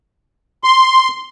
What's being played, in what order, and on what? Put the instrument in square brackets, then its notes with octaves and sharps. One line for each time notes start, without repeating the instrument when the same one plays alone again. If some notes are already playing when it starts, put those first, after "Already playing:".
[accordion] C6